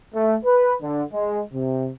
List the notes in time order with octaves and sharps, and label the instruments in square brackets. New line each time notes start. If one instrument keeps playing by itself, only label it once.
[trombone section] A3
B4
D3
G#3
C3